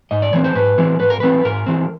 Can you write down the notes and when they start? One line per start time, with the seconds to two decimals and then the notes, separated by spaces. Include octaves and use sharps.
0.11 G#2 D#5
0.22 D5
0.33 E3 G#3 C4 C#5
0.44 C5
0.55 G#2 B4
0.78 E3 G#3 C4
1.00 G#2 B4
1.10 A#4
1.20 E3 G#3 C4 B4
1.45 G#2 A#4
1.66 E3 G#3 C4